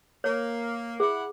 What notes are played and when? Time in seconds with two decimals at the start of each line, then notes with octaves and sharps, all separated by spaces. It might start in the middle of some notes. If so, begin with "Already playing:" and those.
0.24 A#3 C#5
1.00 E4 G#4 F#5